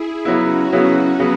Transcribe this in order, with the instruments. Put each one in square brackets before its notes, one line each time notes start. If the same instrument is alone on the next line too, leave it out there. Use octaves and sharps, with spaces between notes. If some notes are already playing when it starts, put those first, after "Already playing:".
Already playing: [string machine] E4 G#4
[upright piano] C#3 F#3 B3 E4 [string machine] C#4 F#4
[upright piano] C#3 F#3 B3 E4
C#3 F#3 B3